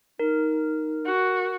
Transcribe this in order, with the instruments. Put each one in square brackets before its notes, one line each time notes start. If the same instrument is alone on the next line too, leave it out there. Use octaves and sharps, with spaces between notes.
[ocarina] D#4 [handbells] A#4
[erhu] F#4